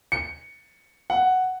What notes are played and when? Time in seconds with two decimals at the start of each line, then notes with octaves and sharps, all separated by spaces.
0.12 C#7
1.10 F#5